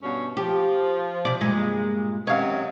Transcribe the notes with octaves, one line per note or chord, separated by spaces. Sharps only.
G2 B2 C#4
F3 G4
C3 D5
G2 A#2 G#3
F#2 C3 D#3 C#5 F5